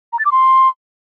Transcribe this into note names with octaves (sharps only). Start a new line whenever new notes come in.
A#5
A6
D6
C6